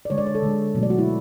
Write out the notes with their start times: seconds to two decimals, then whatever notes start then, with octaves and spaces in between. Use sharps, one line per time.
0.05 D5
0.10 D3 G#3 C#5
0.18 D5
0.27 C#5
0.35 A4
0.43 D3 G#3
0.75 B2 F#3 A3
0.83 D5
0.90 F#4
0.98 E4